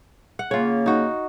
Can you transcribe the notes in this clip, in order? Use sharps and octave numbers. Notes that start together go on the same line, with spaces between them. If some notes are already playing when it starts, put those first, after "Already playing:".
F#5
C#3 A#3 F4 C#5
D#4 F#4